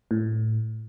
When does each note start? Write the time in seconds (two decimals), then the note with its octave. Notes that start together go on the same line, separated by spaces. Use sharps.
0.11 A2